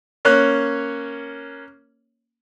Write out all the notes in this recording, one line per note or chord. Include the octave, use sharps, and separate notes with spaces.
A#3 C#4 C#5 F#6